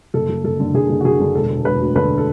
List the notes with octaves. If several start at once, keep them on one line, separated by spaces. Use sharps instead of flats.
F#1 A4
F#1
F#1 A4
D3
F#1 G#4
F#1
F#4
F#1 G#4
D3
E1 A4
E1
E1 B4
D2
D3 B4
A4